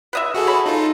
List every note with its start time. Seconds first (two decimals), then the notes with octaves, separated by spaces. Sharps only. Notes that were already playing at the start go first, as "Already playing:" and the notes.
0.13 B4 D#5 E5
0.34 F#4 G#4 A4
0.47 C#4 B5
0.66 D#4 F4 A4